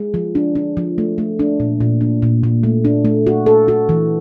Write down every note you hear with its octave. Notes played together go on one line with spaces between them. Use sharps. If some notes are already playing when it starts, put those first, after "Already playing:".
Already playing: G#3
F3
D4
D4
F3
A3
A3
D4
A#2
A#2
D4
A#2
A#2
A3
D4
A3
F#4
A4
F#4
E3